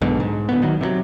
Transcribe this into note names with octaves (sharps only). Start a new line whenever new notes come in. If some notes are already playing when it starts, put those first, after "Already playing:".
B1 G#2 B2 D3
G#2
D2 A2 B3
G#1 D#3 F#3
C3 D#3 F#3